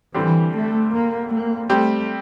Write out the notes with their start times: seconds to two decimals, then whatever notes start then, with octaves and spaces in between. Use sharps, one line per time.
0.14 D3 E3 G3 C4 G4
0.53 A3
0.92 A#3
1.30 A#3
1.69 G3 A3 C4 G4